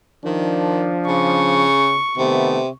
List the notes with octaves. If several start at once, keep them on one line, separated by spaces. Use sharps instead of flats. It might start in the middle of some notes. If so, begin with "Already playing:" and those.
D#3 F3 D4
C#3 C#6
C3 D#3 A3 B3